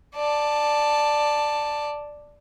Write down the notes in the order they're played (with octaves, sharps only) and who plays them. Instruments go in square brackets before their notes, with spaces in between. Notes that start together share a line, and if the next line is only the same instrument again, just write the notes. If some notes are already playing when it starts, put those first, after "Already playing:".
[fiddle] D5 A5